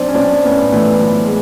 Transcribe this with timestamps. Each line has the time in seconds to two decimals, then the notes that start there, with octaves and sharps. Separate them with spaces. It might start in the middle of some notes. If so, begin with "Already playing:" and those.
Already playing: B1 C4 D4
0.08 C#4
0.15 B1 C4 D4
0.44 A2 B3 C#4
0.72 E3 A3 B3
1.01 B1
1.25 G#3